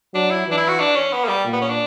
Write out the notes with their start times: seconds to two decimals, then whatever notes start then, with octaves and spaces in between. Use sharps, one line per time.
0.14 F#3 D4
0.31 E4
0.47 E3 D4
0.57 E4
0.68 F#4
0.80 D4
0.96 C#4
1.12 B3
1.24 A#3
1.28 G3
1.45 A#2
1.53 B3
1.61 C#4
1.69 D4